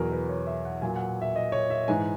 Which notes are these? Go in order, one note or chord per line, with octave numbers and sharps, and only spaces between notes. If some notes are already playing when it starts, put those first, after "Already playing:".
Already playing: E2 B2 F#3 G#4 A#4
B4
C#5
E5
F#5
A#2 F#3 G#5
F#5
E5
D#5
C#5
E5
G#2 E3 G#5